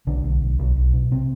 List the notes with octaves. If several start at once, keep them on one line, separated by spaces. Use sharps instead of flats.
B1 D3 D4
B1
B1
B1
B1
B2
C3 C4